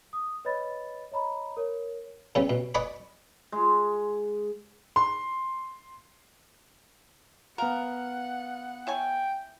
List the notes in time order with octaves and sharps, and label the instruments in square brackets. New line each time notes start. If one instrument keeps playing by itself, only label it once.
[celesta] D#6
B4 C#5 D#5 B5 A6
C#5 D#5 A#5 B5
A#4 C#5
[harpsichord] C#3 G3 B3 C#4
B2
B4 D5 D#5 G#5 B5 C#6
[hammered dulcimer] G#3
[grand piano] C6
[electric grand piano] B3 F5 [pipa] A#4 [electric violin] F#5
[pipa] E4 C#5 G#5 [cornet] G5